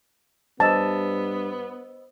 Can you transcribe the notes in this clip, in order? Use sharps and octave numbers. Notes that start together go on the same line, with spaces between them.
G2 B3 C5 D#5 A5 E6